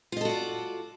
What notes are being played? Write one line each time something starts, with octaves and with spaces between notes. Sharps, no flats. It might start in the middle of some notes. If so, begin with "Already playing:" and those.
F4 F#4 A4 D5 D#5